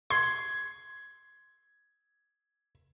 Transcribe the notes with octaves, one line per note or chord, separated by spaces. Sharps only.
C6 G#6